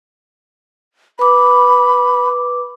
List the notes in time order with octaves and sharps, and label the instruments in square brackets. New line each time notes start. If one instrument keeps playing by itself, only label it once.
[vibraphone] B4 D6 [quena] B5